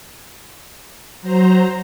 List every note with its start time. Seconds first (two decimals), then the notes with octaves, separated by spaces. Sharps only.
1.22 F#3 C5 A#5